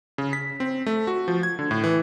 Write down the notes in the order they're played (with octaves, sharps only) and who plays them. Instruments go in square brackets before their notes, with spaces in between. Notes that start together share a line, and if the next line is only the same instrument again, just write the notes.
[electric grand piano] C#3
B6
C4
A3
F#4
F3
G#6
D3
A2
E3